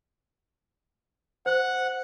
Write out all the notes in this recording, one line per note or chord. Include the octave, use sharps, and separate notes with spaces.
C5 F#5